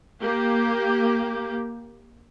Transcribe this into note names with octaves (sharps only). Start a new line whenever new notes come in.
A#3 G4